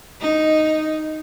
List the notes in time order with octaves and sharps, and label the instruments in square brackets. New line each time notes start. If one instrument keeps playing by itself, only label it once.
[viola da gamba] D#4